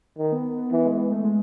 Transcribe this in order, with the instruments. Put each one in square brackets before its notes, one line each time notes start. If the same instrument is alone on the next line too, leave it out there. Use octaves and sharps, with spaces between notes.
[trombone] D#3
[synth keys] B3
B3
B3
[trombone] E3 [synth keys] B3
[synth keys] G#3
B3
A3
G#3